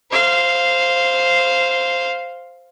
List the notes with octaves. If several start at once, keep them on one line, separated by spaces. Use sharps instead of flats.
C5 F5